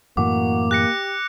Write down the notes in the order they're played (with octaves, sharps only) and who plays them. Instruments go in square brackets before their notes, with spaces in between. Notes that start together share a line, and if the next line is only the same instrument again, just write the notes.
[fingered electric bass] F#2 A2 E3 [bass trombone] A#3 [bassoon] F#4 [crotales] D6
[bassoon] G4 [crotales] F#6 A#6 C#7